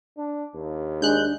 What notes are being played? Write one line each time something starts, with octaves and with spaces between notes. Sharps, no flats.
D4
D#2
G#3 D4 F#6 G6